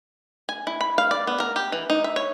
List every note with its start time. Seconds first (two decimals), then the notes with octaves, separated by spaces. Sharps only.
0.49 G#5
0.67 E4
0.81 B5
0.98 F5
1.11 D5
1.27 B3
1.40 A#4
1.56 G4
1.72 E3
1.90 D#4
2.04 E5
2.16 C#5